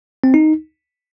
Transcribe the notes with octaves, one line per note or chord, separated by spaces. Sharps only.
C4
D#4